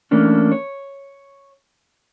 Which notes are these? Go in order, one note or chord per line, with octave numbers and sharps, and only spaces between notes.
E3 A3 A#3 C#4 D4
C#5